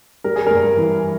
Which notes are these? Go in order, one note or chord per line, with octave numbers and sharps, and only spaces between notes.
G3 A#4
G#4
G2 A#4
E3